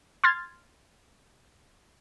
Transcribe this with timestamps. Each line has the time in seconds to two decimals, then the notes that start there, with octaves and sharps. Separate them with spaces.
0.24 C6 F6 G#6 A6